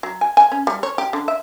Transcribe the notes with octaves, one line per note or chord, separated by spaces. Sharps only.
F#3
G#5
G#5
C#4
G3
C#5
G4
D3
E5